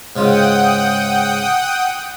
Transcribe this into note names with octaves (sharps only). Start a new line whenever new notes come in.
G#2 C#3 F4 F#5 G5 D#6